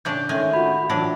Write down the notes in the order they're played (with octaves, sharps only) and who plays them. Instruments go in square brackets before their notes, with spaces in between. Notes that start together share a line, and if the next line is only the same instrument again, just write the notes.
[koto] A2 C#3 D4 [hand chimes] G6
[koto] D#3 G#3 G#5 [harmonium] A3 [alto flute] C#4
[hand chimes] F4 B5 [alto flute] F#4
[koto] A2 E3 D4 [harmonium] F#3 [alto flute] A5